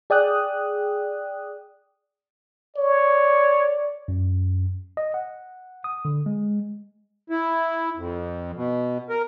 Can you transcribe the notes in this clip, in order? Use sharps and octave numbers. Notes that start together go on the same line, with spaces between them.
G#4 D5 G5 D#6 F#6
C#5 D5
F#2
D#5
F#5
D#6
D3
G#3
E4
F2
B2
A#4